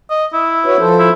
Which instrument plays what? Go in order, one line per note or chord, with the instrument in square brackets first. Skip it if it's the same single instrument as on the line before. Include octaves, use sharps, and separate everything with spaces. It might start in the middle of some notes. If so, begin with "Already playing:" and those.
[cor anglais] D#5
E4
[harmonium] F#4 B4 C#5
F3 A4 C5
[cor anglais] E4